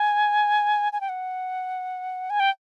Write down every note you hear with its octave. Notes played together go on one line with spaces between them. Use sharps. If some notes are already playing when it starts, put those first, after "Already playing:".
Already playing: G#5
G#5
G5
F#5
G#5
G5